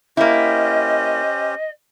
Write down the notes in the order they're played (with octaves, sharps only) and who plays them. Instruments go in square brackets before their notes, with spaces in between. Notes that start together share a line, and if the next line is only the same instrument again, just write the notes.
[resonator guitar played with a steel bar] A#3 E4 [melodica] C#4 G4 C5 [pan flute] D#5